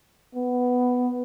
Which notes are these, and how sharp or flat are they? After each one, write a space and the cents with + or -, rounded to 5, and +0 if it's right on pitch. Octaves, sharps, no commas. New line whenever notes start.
B3 +5